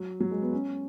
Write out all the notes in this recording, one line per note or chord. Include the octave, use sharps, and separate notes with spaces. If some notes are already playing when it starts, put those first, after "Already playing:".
Already playing: F#3
F#3
G#3
B3
C#4